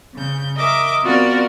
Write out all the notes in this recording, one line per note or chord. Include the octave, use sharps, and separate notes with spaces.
C#3 G6
A#4 D#5 E5 D6
B3 C4 F4 F#4 A#4 D5